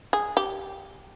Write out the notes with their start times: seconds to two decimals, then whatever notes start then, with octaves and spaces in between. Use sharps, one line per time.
0.13 G#4
0.37 G4